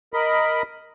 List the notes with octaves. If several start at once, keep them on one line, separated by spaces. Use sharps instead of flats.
A#4 D#5 B5